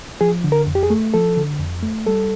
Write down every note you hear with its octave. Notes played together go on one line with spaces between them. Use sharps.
F3 G#4
D3
A#4
F2
G4
G#4
A3
F3 A4
D3
F2
A3
G3 A4